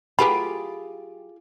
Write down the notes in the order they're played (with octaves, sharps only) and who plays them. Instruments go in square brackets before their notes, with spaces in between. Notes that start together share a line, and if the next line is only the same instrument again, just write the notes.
[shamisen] F#3 B4 B5 [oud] F4 G4 G#4